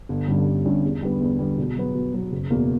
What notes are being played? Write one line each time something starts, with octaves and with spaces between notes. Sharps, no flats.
G1
G2 D3 G3 C#4
G1
G2 D3 G3 C#4
E2
D3 G3 B3
E2
D3 G3 B3
B2
F#3 B3
B2
F#3 B3
F#1
E2 B2 A#3